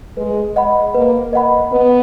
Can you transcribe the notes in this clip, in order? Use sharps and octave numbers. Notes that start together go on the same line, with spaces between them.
G#3 B4
D#5 F#5 B5
A#3 B4
D#5 F#5 B5
B3 B4